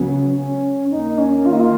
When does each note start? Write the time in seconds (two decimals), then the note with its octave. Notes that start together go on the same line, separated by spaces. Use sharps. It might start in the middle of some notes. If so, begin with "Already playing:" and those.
Already playing: C#2 C#3 F#3 B3 C#4
0.36 C#4
0.90 D#2 D#3 A#3 D#4
1.18 C#4
1.45 F4
1.53 D#4
1.60 F4